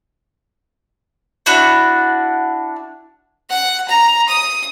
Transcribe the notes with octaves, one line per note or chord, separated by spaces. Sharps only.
D4 E4 F#4 F#5
F#5
A#5
D#6